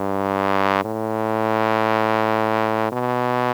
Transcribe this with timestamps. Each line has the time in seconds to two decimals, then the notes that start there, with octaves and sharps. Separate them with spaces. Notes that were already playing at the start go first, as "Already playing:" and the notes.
Already playing: G2
0.84 A2
2.92 B2